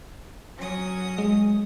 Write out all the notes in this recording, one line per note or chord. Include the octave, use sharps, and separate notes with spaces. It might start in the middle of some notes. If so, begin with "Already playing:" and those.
F#3 C#4 D#6
G#3